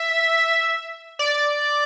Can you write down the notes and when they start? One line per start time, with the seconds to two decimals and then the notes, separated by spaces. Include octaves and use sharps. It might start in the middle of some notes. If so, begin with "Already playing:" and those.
Already playing: E5
1.19 D5